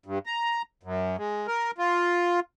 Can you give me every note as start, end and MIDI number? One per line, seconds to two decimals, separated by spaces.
0.06 0.19 43
0.26 0.62 82
0.83 1.16 42
1.18 1.47 56
1.47 1.71 70
1.78 2.40 65